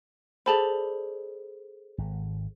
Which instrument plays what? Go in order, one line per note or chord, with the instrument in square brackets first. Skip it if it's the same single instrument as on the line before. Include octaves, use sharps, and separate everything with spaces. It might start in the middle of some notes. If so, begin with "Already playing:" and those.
[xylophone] G#4 A4 C5 [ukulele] D5 A5 B5
[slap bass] G#1